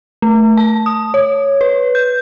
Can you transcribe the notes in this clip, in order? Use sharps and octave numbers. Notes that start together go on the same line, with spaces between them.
A3
A5
D#6
C#5
B4
G6